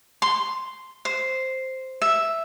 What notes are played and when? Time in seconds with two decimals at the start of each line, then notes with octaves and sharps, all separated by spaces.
0.22 C6
1.05 C5
2.02 E5